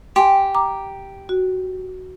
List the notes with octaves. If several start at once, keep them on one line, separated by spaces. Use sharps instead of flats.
G4 G5 G#5 C6
A#5 D6
F#4